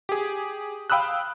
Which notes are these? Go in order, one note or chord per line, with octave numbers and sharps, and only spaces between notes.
G4 G#4
F5 G5 B5 D#6 E6 F#6